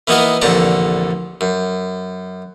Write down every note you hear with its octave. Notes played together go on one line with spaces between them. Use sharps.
E3 A#3 B3 D#4 F#4 A#4
A1 F2 A#2 D3 A5 A#5
F#2